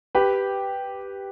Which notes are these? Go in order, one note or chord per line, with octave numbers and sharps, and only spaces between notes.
G4 B4